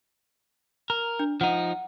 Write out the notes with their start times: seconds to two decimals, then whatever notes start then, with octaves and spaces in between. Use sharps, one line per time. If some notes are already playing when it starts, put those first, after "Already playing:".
0.90 A#4 A#5
1.19 D4
1.41 F3 D#4 F#5